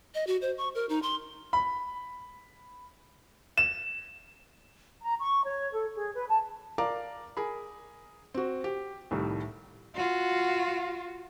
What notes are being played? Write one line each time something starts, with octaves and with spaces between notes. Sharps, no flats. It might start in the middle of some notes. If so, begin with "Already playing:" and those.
D#5
F#4
C5
C#6
A#4
D#4
C6
B5
E7
A#5
C#6
C#5
A4
G#4
B4
A5
A#4 D5 F5 A#5 D6
G#4 A#4 B5
C4 F#4
G4
C2 A2 D#3 G3 A3
F4 F#4